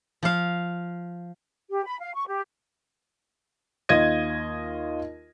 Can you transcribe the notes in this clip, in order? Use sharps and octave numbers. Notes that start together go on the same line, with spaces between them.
F3 F5
G4
B5
F5
C#6
G4
D#2 F4 D#5 G#6 A#6 D#7